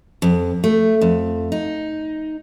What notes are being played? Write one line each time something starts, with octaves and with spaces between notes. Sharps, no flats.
F2
A3
F2
D#4